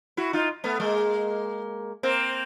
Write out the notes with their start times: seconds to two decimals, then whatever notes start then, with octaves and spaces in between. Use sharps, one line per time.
0.17 E4 F#4
0.33 D#4 F4
0.64 A3 B3
0.80 G#3 A#3
2.03 A#3 C4